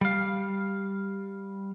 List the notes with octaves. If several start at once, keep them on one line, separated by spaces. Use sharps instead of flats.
G3 F5